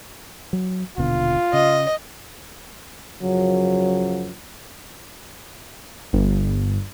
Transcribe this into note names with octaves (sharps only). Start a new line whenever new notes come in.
F#3
D#1 B2 D3 F4
C#3 D#5
F#2 C#3 F3 F#3
G1